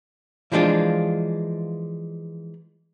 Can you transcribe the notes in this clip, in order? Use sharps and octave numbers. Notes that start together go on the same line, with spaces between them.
E3 F3 G#3 D4 F4